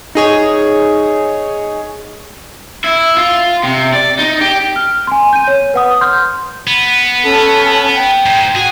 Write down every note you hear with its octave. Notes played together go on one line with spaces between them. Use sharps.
D#4 G#4 C#5
E4
F4
C3
D5
D#4
G4
F6
G#5 C6
G6 D#7
C#5
B4 F#5 D#6
C6 F6 G6
B3
C#4 A4 A5
G5
G#2
F#4 G#4